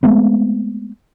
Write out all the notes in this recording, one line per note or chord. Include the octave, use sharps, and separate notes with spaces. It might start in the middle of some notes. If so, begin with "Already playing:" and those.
G#3 A3 B3 C4